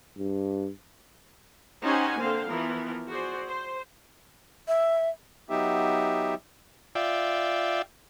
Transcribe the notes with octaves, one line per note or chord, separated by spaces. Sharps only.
G2
C#4 D#4 G4 C5 F#5 G#5
D3 A#3 C4 C5 F5
E3 F3 B3 A#4
F#4 G#4 C5 D5
C5
E5
F#3 B3 D#4 G4 E5
F4 D5 E5 G5